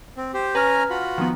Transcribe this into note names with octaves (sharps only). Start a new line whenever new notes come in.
C4
G4 C5
C#4 B4 G#5 A#5 F6
F4 F#4 B5
D#3 F3 B3